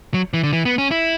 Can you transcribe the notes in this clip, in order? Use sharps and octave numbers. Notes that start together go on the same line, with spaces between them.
F#3
E3
D3
E3
B3
C#4
E4